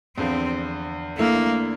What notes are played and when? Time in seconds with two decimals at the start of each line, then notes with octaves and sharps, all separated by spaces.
0.17 E2 D3 F3 C4
1.18 D3 A3 A#3 E4